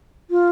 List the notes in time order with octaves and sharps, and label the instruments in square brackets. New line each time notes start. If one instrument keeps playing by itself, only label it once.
[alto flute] F4